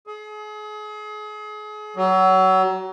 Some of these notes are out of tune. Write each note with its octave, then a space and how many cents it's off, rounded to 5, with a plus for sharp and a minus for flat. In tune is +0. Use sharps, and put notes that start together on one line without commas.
G#4 +35
F#3 +30